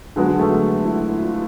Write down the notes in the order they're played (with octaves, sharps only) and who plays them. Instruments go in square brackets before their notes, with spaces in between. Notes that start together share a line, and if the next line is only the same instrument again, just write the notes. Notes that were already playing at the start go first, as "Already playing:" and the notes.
[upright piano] D3 F#3 G#3 B3 G#4
A3 A4
E4
E4
F4